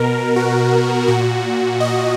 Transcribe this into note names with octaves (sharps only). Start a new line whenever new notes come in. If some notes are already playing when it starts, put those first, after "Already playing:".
Already playing: B2 A#4
F#4
A#2 F#4
D#5